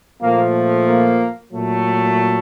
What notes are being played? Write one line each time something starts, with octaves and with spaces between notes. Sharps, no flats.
A#2 F3 A3 A#3
A#3
A#2 F#3 A3